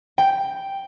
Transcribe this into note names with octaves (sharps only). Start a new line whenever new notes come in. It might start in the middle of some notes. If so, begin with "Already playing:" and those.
G5